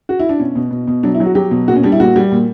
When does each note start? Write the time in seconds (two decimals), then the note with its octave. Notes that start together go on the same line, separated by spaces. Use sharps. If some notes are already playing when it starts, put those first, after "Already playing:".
0.09 F#4
0.19 E4
0.29 D4
0.39 B2 C#4
0.55 B2
0.71 B2
0.88 B2
1.03 F#3 D4
1.15 E4
1.20 F#3
1.25 F#4
1.35 F#3 G4
1.51 B2
1.68 A#2 F#4
1.76 C#4
1.83 G3 D4
1.92 E4
2.00 A#2 F#4
2.16 G3
2.32 A#2